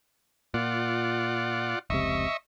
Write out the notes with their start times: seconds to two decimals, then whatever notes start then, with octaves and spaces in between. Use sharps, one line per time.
0.54 A#2 F4 D5 F#5
1.90 F1 C#2 C3 D#5 E5 C#6